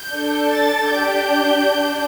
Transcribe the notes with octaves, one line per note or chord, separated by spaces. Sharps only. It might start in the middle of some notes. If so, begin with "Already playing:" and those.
Already playing: G6
D4 A4
A6
D4 G4 G6
D4